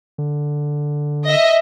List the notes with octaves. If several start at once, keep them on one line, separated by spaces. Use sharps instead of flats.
D3
D#5 E5